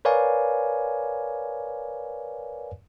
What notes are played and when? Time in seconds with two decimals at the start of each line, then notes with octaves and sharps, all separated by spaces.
0.05 A#4 B4 C#5 D5 F5 G#5